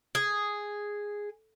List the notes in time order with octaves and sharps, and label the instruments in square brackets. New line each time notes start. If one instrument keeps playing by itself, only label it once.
[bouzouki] G#4